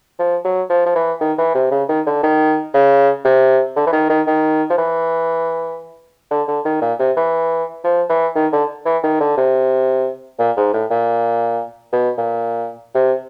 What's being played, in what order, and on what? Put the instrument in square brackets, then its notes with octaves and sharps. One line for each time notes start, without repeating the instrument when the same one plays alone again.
[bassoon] F3
F#3
F3
F3
E3
D#3
E3
C3
C#3
D#3
D3
D#3
C#3
C3
D3
E3
D#3
D#3
D#3
F3
E3
D3
D3
D#3
A#2
C3
E3
F3
E3
D#3
D3
E3
D#3
D3
C3
A#2
G#2
A2
A#2
B2
A#2
C3